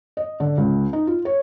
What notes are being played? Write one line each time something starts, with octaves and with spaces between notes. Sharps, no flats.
D#5
D3
C#2
D#4
F4
C#5